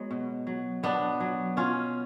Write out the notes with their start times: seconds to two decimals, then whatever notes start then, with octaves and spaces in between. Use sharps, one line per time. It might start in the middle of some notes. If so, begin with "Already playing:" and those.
Already playing: F#3 G#3 B3
0.11 B2
0.47 F#3
0.83 B2 B3 D4
1.20 F#3
1.57 B2 C#4 F4